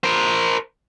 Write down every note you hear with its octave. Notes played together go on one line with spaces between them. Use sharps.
A#4 C5